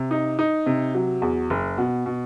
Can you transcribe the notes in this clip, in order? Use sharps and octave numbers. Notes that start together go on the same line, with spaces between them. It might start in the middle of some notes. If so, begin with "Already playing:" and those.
Already playing: C3
D#4
D#4
C3
F#3
E2
F#1
B2
B2